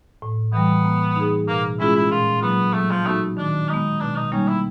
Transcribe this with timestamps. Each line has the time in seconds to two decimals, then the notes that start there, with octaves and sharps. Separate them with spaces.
0.22 A2
0.53 E3 G3 B3
0.85 A#3
1.16 D#4 G#4
1.48 B2 A#3
1.80 G#3 C#4 E4 F4 G#4
1.95 E4
2.11 A#2 F4
2.42 F#3 A#3 B3
2.74 F#3 A3
2.90 F3
3.06 A3 B3 D#4 F#4
3.37 D#3 D4
3.69 G#3 B3 D#4
4.00 B2 D4
4.16 D#4
4.32 G3 A#3 C#4 D#4
4.48 E4